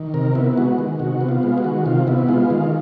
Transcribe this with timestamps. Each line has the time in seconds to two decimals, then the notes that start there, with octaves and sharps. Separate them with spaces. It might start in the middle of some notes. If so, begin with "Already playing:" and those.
Already playing: D#3
0.14 C3 A#4
0.35 B3 E4
0.57 G#3 F#4
0.78 D#3
0.99 C3 F#4
1.21 B3
1.29 F4
1.43 G#3
1.58 F#4
1.64 D#3
1.86 C3 F4
2.07 B3 E4
2.28 G#3 F4
2.50 D#3 F4